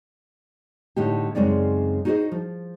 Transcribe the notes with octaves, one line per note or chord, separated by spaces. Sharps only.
A2 D3 D#4 G4
F#2 C#3 G#3 C4 D#4 D5
D#4 F#4 G#4 B4 C5 D#5
F3